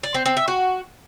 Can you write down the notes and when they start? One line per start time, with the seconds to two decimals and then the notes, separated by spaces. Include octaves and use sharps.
0.03 D5
0.14 C4
0.26 C4
0.37 E5
0.48 F#4